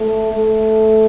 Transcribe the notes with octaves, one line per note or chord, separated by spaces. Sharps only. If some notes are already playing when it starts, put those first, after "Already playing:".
Already playing: A3
A3